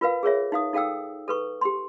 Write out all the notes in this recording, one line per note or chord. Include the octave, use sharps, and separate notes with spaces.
F4 A#4 B4 F5
G#4 A#4 C#5 E5
D#4 F5 D#6
D#4 A4 F5 G5 E6
A4 B4 C#6
G4 C6